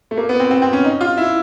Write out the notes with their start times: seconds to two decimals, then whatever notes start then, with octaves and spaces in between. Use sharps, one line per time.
0.11 A3
0.18 A#3
0.29 B3
0.40 C4
0.51 C4
0.62 C4
0.73 C#4
0.84 D#4
1.01 F4
1.17 E4